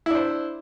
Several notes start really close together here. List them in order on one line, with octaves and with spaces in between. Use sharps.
E4 D4 C5